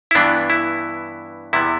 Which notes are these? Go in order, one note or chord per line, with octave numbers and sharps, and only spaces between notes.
E4
G2 E3 B3 D4
E4
E2 C3 G3 B3 E4